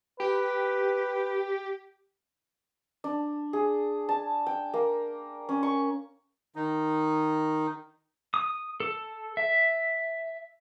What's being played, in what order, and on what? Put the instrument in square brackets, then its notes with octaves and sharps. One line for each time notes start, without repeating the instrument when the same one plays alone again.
[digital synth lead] G4 [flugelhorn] B4
[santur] D4
G#4
A5
G5
A#3
C#4
C#6
[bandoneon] D#3 D#4
[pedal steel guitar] D#6
A4
E5